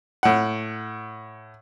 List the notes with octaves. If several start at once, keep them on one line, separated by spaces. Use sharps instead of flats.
A2 F#5